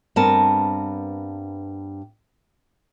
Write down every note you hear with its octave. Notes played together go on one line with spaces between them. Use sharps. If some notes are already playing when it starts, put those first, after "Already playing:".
G2 B3 C4 A#4 A5